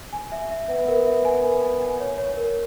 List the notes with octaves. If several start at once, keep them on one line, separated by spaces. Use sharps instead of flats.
G#5
E5
E5
B3 E5
A#4
E5
G#5
A#4
G#5
G#5
C#5
C#5
A#4